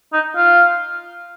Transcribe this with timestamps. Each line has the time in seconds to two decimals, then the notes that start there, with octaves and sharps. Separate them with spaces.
0.13 D#4
0.36 F4